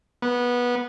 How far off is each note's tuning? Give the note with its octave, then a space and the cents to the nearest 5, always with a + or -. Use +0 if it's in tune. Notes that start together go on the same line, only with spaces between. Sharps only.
B3 -15